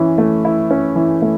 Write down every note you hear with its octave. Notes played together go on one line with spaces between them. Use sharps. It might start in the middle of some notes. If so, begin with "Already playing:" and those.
Already playing: E3 C#4
A3
E4
C#4
E3
A3